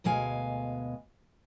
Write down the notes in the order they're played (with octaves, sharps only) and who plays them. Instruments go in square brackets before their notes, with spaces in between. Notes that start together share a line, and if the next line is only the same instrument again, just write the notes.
[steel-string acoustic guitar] D2 B2 G#3 F5 G#5